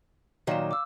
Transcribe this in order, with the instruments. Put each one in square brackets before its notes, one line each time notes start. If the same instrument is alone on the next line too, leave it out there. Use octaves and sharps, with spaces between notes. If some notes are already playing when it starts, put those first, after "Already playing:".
[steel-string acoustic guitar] A#2 D#3 F#3 [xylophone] F5 D6 E7
[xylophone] D6 E6